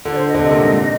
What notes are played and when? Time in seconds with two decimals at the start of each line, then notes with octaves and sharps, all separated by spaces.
0.05 D3 F4
0.13 D5
0.16 C5
0.28 D#5
0.34 D3
0.39 C3 D#5
0.51 A#2
0.62 G#2